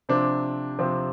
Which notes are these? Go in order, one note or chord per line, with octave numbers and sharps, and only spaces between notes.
C3 F3 C4 D4
C3 F3 C4